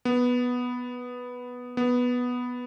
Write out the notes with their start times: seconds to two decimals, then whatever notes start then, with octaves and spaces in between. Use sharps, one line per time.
0.05 B3
1.77 B3